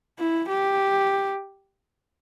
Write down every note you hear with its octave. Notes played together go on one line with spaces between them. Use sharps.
E4
G4